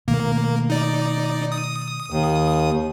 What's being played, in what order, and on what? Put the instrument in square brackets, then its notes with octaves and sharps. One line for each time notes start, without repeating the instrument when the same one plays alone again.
[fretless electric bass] B2 D#3 A3 [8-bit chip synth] A#3
[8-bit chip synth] D#4 D5
D#6
[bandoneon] D#2